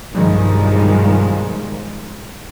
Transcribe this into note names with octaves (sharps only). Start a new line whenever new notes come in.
B1 G2 D#3 F3 G3 G#3